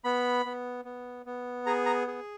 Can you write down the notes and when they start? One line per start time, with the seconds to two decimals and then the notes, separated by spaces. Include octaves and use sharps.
0.04 B3 B5
0.46 B3
0.85 B3
1.26 B3
1.66 G#4 A#5
1.86 A#5
2.07 G#4